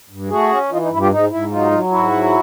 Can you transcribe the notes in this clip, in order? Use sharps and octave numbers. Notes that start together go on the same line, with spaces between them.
G2
A3 F#4 G#4
C#4
E3 D#4 F4
D#4
G2 E4
F4 G4
G#2 D#4
G#2 E4
F#3 D#4 F4
F#3
G#2 E4 F#4
F#3